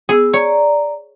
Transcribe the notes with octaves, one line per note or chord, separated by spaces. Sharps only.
B3 G#4 E6
C#5 D5 A#5